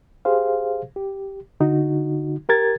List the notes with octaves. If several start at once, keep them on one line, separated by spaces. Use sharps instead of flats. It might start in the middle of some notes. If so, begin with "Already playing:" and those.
G4 G#4 C5 F5
G4
D3 D#4 F#4
G4 A#4 G#6 A6